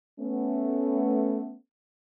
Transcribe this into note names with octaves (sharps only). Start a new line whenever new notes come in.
A3 B3 C#4